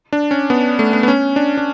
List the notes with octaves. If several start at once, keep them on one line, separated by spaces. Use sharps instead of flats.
D4
C#4
B3
A3
B3
B3
C#4
D4
D4